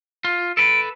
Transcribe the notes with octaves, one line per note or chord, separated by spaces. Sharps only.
F4
A4 B4 D7